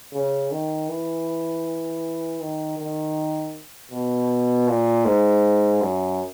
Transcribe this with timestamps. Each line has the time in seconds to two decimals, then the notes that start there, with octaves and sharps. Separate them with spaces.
0.13 C#3
0.52 D#3
0.89 E3
2.41 D#3
2.78 D#3
3.92 B2
4.68 A#2
5.05 G#2
5.82 F#2